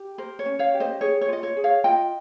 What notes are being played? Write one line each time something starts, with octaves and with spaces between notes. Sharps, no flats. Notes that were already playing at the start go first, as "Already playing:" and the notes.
Already playing: G4
A#4 C5
C#5
C#4
C#5 F5
G4
C5 D#5
G#4 C#5
C#5
F4 D#5
C#5
G#4
C#5 F5
F4 D#5 G5